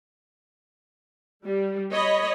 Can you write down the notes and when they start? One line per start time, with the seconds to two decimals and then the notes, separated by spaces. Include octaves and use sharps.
1.45 G3
1.92 C#5 D#5 B5